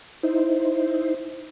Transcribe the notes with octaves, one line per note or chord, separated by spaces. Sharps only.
D#4 E4 C5